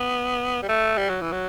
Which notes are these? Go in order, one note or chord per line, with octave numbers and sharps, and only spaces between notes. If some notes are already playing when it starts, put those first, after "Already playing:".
Already playing: B3
G3
A3
G3
F#3
E3
F#3